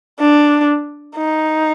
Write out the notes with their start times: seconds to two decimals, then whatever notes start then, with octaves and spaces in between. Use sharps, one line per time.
0.20 D4
1.16 D#4